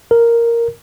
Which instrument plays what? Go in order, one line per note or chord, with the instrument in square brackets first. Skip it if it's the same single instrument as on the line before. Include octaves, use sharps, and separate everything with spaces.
[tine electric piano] A#4